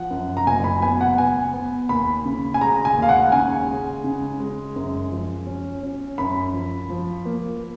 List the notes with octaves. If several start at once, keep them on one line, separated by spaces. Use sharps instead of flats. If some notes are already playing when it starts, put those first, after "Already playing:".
Already playing: F3 F#5
F#2
A#5
F#1 G#5
B5
B3 G#5
F#5
B3 G#5
B3
D#2 B5
C#3
G#5
G#3 A#5
G#5
D#2
F5
F#5
C#3 G#5
G#3
C#3
G#3
F#2
F3
C#4
C#4
F#2 B5
F3
F3
A#3